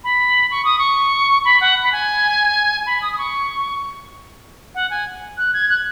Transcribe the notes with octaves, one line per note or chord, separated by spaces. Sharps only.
B5
C#6
D#6
C#6
B5
F#5
B5
G#5
B5
D#6
D#6
C#6
F#5
G#5
F#6
G#6
F#6